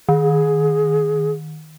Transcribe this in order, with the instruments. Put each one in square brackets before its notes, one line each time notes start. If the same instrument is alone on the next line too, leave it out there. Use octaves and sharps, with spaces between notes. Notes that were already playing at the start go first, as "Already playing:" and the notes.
[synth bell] D#3 [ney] G#4